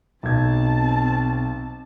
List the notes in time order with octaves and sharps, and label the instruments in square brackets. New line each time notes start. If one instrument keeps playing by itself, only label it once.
[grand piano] B1 G#6 [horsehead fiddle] C4 A5